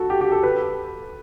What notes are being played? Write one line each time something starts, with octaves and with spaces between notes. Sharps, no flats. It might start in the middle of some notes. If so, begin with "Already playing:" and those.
Already playing: F#4 A4
G4
G4
A4
B4